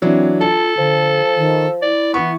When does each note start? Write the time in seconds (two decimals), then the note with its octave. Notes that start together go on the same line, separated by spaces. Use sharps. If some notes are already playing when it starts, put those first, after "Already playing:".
0.02 E3 F#3 C4 D4
0.41 F4 A4 A5
0.78 D3 F3
1.37 D#3
1.82 E4 D5
2.14 E3 B3 C#6